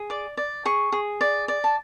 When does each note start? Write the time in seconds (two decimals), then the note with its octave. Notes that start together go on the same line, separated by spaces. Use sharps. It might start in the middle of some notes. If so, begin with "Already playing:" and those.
Already playing: G#4
0.10 D5 D6
0.37 D5
0.65 G#4 C#6
0.92 G#4
1.21 D5
1.48 D5
1.64 A5